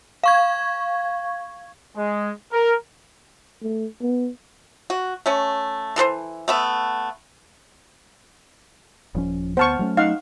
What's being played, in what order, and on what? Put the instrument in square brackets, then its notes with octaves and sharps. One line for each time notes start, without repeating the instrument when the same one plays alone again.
[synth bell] F5 C#6 G#6
[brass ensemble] G#3
A#4
[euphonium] A3
B3
[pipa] F#4
A3 C#4
E3 A4 B4 C5
A3 B3 E5
[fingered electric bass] D#1 F3 C#4
[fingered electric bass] D2 B3 [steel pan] C5 A5 C#6 [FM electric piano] F#5 F6
[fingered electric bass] F#3 A3 C#4
[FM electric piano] D#4 D#5 [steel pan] F5 F#5